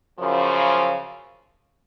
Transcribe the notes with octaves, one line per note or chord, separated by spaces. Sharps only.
F#2 C#3 F3